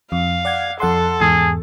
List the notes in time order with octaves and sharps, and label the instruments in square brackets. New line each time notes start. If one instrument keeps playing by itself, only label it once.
[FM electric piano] F2 [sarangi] F5
[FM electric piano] D5 F#5 G#6
[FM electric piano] F2 F#5 C6 [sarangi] A4
[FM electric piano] E2 G#2 [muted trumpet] G#4